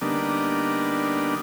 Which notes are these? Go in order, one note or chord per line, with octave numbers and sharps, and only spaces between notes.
D3 G3 A#3 B3 D4 D#4